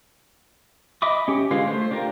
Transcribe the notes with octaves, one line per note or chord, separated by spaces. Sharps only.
D#5 E5 B5 D6 D#6
C#4 G4
D3 G#3 F4 B4 F5
A3 C5
D4 F4 G4 A#4